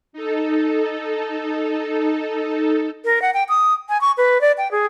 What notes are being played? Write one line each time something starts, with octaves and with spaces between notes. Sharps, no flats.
D#4 A4
A#4
F#5
G5
D#6
G#5
C#6
B4
D5
G5
G#4